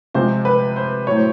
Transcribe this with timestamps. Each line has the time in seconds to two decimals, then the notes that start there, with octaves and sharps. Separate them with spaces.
0.14 C3 F3 G#3 C5
0.45 B4
0.76 C5
1.07 A2 F#3 C#5
1.16 C5